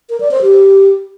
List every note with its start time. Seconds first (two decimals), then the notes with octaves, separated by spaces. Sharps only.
0.10 A#4
0.20 D5
0.31 C5
0.42 G4